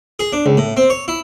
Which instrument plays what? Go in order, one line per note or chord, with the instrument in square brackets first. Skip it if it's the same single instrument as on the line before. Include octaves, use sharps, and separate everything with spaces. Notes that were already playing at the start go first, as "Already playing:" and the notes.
[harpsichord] G#4
D4
C#2
A2
C4
C#5
E4